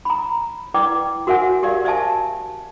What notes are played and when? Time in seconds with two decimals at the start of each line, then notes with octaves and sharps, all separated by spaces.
0.05 A#5 B5
0.74 E4 B4 D5 G5 D6
1.27 F#4 A#4 C5 E5 F#5 G#5
1.63 G4 A#4 D5 F5
1.84 C5 D5 E5 F5 G#5 A5